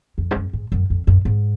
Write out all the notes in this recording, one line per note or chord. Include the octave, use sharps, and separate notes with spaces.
F2
G#2
F#2
G#2
F#2
F2
F#2
G#2